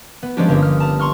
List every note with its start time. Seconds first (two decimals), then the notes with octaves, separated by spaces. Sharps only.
0.23 B3
0.37 F3 G3 G#3 C#4 D4 G4
0.48 G1 A#3 G4 D#6
0.62 F6
0.80 A5 A#5
0.99 A#5 C6 C#6 F6